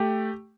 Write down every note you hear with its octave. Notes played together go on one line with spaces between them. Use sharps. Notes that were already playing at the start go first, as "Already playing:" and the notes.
Already playing: A3 G4